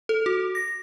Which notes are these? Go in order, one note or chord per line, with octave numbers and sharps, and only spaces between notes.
A4
F#4
A#6